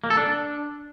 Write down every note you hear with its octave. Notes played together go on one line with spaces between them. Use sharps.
A#3
A4
D4